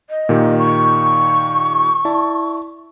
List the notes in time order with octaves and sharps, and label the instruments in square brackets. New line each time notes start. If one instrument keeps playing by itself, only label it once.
[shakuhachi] D#5
[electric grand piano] A#2 D#3 G4
[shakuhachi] C#6
[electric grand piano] E4 D5 A5